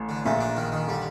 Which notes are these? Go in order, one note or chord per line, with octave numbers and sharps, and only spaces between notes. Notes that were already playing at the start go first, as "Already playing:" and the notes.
Already playing: A1 A2
D3
A#1 A#2 A3
D4
D#3
D#3
D3 G3